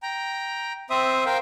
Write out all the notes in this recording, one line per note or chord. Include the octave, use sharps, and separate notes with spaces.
G5 A#5
C4 C5 E5 D#6
A#4 C5 F5 G5